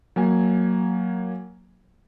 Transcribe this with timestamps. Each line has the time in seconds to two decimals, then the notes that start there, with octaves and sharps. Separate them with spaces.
0.16 F#3 A#3 G#5